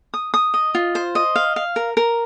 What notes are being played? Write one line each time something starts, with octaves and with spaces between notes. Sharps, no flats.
D#6
D#6
D#5
F4
C5
D#5
F5
F5
A#4
A#4